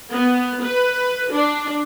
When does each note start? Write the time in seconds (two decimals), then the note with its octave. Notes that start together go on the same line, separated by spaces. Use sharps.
0.12 B3
0.63 B4
1.31 D4